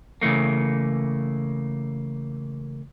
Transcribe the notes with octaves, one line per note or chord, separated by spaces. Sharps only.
C#3 E3 A3 A#3